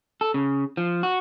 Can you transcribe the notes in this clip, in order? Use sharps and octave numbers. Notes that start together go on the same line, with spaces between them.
A4
C#3
F3
F#4